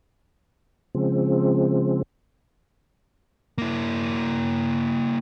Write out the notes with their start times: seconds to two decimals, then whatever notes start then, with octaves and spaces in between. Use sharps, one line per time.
0.95 C#3 F3 G#3 C4
3.58 A#3 E4